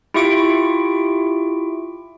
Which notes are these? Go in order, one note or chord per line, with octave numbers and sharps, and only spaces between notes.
E4 F4 G4 E5 C#6 D7